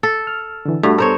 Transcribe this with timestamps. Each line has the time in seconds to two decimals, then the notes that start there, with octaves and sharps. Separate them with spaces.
0.03 A4
0.27 F6
0.65 D3 E3
0.83 G2 A3 D4 F#4
0.98 B3 A4 A#4 C5 C#5